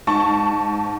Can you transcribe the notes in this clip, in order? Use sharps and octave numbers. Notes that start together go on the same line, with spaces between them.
G#2 A5 C#6